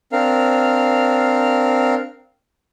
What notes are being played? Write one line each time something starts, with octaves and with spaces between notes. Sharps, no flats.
C4 D4 A#4 F5